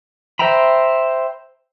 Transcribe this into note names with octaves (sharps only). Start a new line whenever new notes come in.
C5 E5 G5 A#5 B5